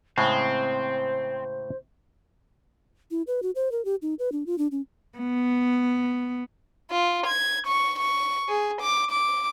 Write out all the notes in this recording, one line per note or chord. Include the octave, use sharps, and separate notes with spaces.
A2 C#3 G#3 C4 C5
E4
B4
F#4
C5
A#4
G4
D#4
B4
D4
F4
D4
C#4
B3
F4
G#6
C#6
C#6
G#4
D6
D6